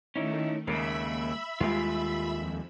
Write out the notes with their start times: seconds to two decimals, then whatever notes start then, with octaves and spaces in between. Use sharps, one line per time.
0.16 D#3 A3 C#4 D#4 E4
0.67 D#2 C#3 G#3 A#3 E5 B5 E6
1.60 D#2 G3 G#3 F4
2.36 F2